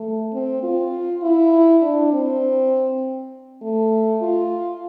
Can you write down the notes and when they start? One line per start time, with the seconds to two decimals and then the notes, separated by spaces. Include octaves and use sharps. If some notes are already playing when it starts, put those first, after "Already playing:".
Already playing: A3
0.33 C4
0.63 F4
1.22 E4
1.82 D4
2.13 C4
3.62 A3
4.21 F4